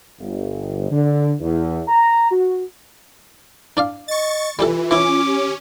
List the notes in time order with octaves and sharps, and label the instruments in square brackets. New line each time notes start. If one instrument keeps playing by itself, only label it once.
[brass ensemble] G1
D3
E2
A#5
F#4
[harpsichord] D4 D5 F5
[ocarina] D#5 [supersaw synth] C#6 A6
[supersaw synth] E3 [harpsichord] G3 G4 A4 [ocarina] F4
[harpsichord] E3 E4 [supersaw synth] C#4 [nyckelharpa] D6
[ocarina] G4